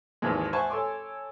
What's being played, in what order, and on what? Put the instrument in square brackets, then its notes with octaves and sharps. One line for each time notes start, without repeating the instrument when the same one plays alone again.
[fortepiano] G#1 D#2 G#2 E3 F3 G#3
C5 E5 F#5 G#5 A5 C#6
A4 C#5 G#5 C6 D6